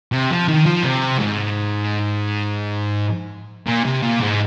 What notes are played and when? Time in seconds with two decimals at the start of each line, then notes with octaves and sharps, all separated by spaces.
0.12 C3
0.31 F3
0.48 D#3
0.66 F3
0.83 C3
1.19 G#2
3.67 A#2
3.85 C3
4.03 A#2
4.21 G#2